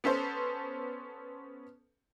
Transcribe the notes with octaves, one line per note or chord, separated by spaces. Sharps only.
B3 C#4 A4 C5